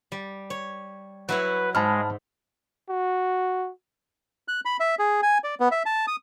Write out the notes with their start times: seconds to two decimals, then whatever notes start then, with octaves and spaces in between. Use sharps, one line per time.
0.12 G3
0.50 C#5
1.29 F#3 E4 B4 C#5
1.75 G#2 G#3 A5 B5 F6
2.89 F#4
4.48 F#6
4.65 B5
4.80 E5
4.99 G#4
5.23 G#5
5.44 D5
5.60 B3
5.71 E5
5.86 A5
6.07 D#6